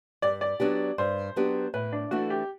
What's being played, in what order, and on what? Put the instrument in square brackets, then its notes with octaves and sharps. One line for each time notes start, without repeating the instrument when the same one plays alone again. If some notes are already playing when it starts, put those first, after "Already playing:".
[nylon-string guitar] G2 [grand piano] D5
[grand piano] D5
[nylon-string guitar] F#3 B3 D4 G4
[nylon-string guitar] G2 [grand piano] C5
[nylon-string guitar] F#3 B3 D4 G4
[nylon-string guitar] A2 [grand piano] B4
[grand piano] D4
[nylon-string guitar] E3 A3 D4 A4 [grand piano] F#4
[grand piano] G4